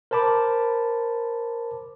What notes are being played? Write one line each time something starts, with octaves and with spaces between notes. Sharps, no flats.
A#4 C5 A5 B5 D6